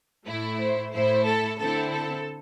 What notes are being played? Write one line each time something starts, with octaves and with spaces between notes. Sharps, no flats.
A2 A3 E4
C5
A2 A3 E4 C5
A4
D3 C4 E4 A4
A4